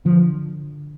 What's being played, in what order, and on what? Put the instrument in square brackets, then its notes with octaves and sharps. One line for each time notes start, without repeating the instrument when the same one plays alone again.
[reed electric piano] D3 [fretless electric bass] F3